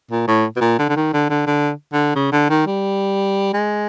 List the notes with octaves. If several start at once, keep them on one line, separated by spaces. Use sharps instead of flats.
A#2
A2
B2
A#2
D3
D3
D#3
D3
D3
D3
D3
C#3
D3
D#3
G3
G#3